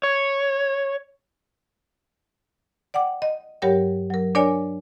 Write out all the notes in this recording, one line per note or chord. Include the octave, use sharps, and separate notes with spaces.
C#5
D5 F#5 G5 D6
D#5
G2 F#3 G4 A#4 C#5 G5
F#3 A#4
D4 A#4 C#5 D5 G#5